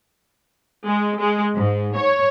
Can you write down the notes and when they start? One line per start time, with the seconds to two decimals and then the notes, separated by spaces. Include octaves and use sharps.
0.85 G#3
1.19 G#3
1.57 G#2
1.97 C#5